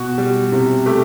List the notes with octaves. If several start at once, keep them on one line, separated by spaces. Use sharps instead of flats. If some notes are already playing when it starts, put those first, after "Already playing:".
Already playing: B2 F#4
G3
C3
A3 G4